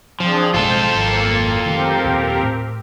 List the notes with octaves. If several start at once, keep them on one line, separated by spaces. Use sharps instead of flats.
F3 C4 D4 G#4
A1 B2 G#3 F4 A4 C5
G#1 A#3
D#3 F3 A3 C4 G4 A#4
D#2 A#2
A2